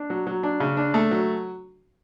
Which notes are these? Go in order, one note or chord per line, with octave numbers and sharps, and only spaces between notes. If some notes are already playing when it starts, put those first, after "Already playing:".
Already playing: D4
F#3
F#3
D4
C#3
D4
A3
F#3